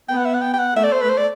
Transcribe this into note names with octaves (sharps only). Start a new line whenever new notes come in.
B3 G5
F#5
E5
F#5
G5
G5
F#5
A3 E5
D5
C5
B4
C5
D5